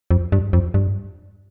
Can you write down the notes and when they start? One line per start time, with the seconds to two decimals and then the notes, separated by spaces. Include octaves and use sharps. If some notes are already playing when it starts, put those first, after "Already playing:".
0.11 F2
0.32 G2
0.53 F2
0.74 G2